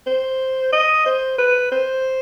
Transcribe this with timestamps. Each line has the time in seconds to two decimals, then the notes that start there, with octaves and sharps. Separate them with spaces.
0.07 C5
0.72 D#5
1.06 C5
1.38 B4
1.71 C5